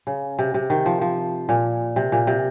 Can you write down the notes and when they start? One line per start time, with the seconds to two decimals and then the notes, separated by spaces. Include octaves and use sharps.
0.07 C#3
0.39 C3
0.54 C3
0.70 D#3
0.86 F3
1.01 F3
1.49 A#2
1.96 C3
2.12 A#2
2.27 C3